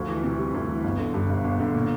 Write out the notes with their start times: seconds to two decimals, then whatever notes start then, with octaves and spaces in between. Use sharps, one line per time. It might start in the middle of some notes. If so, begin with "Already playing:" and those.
Already playing: D2 F3
0.08 E3
0.23 C3
0.39 G3
0.54 D2
0.69 E3
0.84 G1
0.99 D3
1.14 G2
1.29 G1
1.44 G1
1.60 D3
1.75 A#2